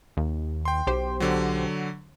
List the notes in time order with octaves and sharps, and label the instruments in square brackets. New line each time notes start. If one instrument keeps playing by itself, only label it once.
[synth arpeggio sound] D#2
[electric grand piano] G5 C6
[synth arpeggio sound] B1 G4 C5
[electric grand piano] D3 F#3